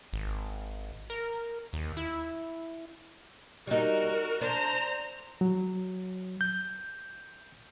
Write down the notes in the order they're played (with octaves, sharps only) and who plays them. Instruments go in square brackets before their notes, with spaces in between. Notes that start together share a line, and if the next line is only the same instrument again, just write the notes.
[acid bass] G#1
A#4
D#2
E4
[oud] G3 D#4 [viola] F#4 A#4
[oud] D4 [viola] C5 A#5
[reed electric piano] F#3
G6